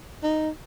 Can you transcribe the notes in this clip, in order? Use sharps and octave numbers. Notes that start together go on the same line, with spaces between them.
D#4